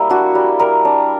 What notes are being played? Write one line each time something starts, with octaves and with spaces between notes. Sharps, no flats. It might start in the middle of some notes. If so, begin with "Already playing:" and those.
Already playing: G3 A#3 E4
D4 F#4
G3
G3 A#4
D4